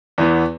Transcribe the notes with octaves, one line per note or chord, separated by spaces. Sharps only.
E2 E3 B3